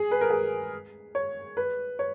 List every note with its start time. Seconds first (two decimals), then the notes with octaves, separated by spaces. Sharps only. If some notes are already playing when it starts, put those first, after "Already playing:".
Already playing: G#4
0.11 B4
0.21 A#4
0.30 G#4
1.15 C#5
1.57 B4
1.99 C#5